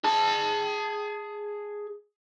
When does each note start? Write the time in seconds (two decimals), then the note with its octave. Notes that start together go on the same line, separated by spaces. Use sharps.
0.04 G#4 A5